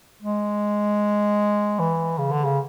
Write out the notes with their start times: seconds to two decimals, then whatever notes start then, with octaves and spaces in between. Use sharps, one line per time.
0.22 G#3
1.79 E3
2.18 C#3
2.32 D3
2.45 C#3